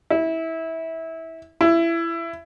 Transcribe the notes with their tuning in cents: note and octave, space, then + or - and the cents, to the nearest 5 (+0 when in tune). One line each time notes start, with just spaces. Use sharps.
E4 -20
E4 +20